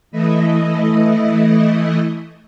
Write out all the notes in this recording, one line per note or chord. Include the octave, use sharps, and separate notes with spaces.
E3 A3 E4 D#5